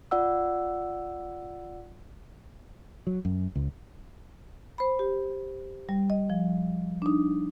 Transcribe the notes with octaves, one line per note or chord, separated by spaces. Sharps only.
F4 D5 F#5 E6
F#3
F#2
C#2
C5 B5
G4
G3
D#5
F3
D4 D#4